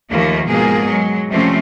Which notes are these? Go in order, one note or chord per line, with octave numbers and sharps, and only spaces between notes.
D#2 D#3 F3 A3 A#3
G#2 B2 F3 A#3 G#4 A#4
F#3 G#3
C3 F3 G3 A3 C4 C#4